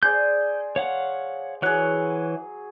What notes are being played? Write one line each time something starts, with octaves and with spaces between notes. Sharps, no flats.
G#4 C5 D5 G6
C#5 F5 F#5
E3 F#3 G#4 C#5 F#6